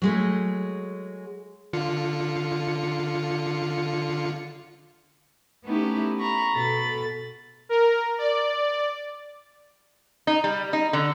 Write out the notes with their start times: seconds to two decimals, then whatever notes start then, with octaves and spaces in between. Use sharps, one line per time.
0.02 F#3 G#3 A3
1.73 D3 F4 C#7
5.65 A3 B3 C#4 D#4 E4 G4
6.19 A#5 B5 C#6
6.55 B2 A4 B5 A6
7.69 A#4
8.18 D5
10.27 D#4
10.44 G3
10.73 D#4
10.93 D3